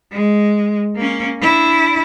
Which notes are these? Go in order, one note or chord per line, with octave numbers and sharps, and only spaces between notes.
G#3
A#3 C#4
D4 E4